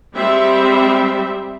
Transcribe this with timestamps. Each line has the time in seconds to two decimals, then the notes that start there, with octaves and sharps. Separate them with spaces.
0.15 G3 G#3 C4 E5